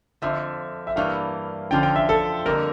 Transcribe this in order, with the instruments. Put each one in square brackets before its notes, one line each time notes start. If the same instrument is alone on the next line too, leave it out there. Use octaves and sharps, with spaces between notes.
[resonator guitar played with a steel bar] F2 D3 F3 [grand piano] E5
[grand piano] E5
[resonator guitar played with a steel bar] G2 E3 G3 A#3 [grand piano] F5
[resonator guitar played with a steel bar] D3 F3 C#4 F4 [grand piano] G5
[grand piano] G5
E5
A4
[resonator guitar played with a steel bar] F2 D3 G3 A#3 [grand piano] A#4